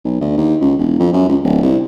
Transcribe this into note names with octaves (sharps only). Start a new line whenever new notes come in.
B1
D2
D#2
C#2
E1
F2
F#2
C#2
D1
C2